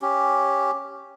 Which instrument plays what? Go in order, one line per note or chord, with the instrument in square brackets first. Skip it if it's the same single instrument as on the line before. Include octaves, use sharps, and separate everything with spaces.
[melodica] C#4 G4